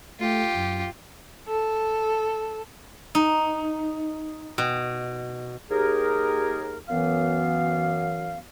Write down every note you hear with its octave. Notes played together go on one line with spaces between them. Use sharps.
A3 F4 G4
F#2
A4
D#4
B2
D#2 G4 G#4 A#4
F#2 E3 B3 F5